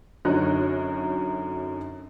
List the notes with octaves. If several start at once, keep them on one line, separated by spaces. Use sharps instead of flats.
F#2 D3 D#4 C#5 A#5 F#6